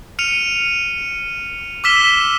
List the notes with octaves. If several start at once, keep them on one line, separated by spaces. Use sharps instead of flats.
F6 C#7 D#7 F7
D6 E6 F6 B6 E7 G7